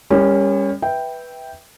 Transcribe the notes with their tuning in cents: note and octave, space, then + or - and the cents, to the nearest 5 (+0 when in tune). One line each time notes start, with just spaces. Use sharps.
G3 +35 C#4 +0 A#4 +0
B4 -5 E5 -10 G5 +0